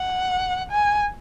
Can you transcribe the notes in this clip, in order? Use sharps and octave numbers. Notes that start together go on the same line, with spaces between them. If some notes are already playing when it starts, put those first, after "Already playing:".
Already playing: F#5
G#5